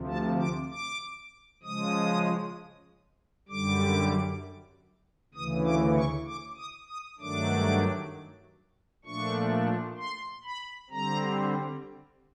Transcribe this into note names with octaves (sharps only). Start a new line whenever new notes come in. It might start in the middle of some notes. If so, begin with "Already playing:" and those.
Already playing: D2 C3 F3
A5
D6
D6
C#3 F3 G#3 D#6
F#2 D3 G3 D6
D2 C#3 E3 D#6
D6
C#6
D6
D#6
D#6
G2 D#3 F#3 A3 D4 D6
A#2 F3 A3 D4 C#6
C6
B5
D3 G3 C4 A#5